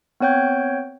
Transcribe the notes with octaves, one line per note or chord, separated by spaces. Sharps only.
B3 C4 C#5 G5 G6